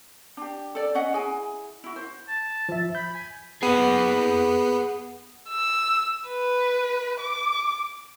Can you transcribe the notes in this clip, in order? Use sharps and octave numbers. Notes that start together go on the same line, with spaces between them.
D4 G4
A4 D5
C#4 D#5 F#5
E4 G#4 G#5
E4 F#4
C5
A5
F3 E5
B5 G6
G#5
B3 G#4 F#5
E6
B4
D6